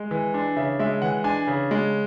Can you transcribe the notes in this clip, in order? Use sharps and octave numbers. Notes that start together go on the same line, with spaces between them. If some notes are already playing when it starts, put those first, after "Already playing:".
Already playing: G#3
E3
D4
C#3 E5
G#3 E5
E3 F#5
D4 G#5
C#3
G#3